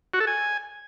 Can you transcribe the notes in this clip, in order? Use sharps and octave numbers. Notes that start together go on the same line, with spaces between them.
F#4
A4
G#5